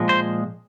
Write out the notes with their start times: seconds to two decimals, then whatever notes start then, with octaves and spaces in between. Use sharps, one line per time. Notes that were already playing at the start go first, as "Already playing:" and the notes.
Already playing: A#2 F3 G#3
0.09 C5